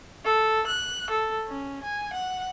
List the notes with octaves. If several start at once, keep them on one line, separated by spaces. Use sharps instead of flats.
A4
F#6
A4
C#4
G#5
F#5